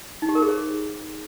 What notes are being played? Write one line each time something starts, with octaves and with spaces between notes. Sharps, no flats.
D#4
G4
A#4
G#4
C5